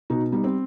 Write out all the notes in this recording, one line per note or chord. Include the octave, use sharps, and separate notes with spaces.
B2 D#4 F#4
G3 B3 D#4
C4